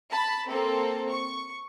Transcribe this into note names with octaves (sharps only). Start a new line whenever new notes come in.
A5 B5
A#3 C4 A4
C#6